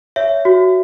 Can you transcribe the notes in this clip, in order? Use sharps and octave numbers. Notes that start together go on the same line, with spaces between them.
C#5 E5
F#4